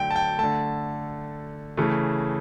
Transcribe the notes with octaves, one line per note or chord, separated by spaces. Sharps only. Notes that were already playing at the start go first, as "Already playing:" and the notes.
Already playing: D3 F#3 A3 G5
A5
G5
D3 A3 A5
C#3 E3 A3